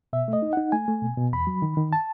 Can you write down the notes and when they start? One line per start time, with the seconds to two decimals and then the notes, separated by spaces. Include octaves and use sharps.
0.13 B2 E5
0.28 A3
0.33 D#5
0.42 D#4
0.53 D#4 F#5
0.72 A3 G#5
0.88 A3
1.02 B2
1.17 B2
1.33 E2 B5
1.47 F#3
1.62 D#3
1.77 D#3
1.93 A5